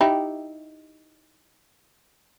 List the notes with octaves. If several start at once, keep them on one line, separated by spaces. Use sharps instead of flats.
D#4 E4 G4